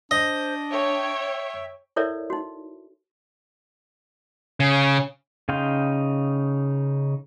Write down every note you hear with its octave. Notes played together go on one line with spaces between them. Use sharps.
D4 C5 D#5
C#5 E5 G5
E4 A4 A#4 C#5 D5 E5
D#4 F#4
C#3
C#3 D#4 F5 G5 C6